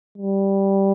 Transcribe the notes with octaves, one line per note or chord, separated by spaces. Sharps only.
G3